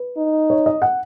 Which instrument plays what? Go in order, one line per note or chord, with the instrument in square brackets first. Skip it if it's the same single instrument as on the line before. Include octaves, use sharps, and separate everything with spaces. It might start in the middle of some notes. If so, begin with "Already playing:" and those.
Already playing: [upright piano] B4
[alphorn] D#4
[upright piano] C#5
D#5
F#5